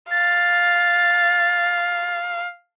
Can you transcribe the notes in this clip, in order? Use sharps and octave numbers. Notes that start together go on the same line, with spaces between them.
F5 A6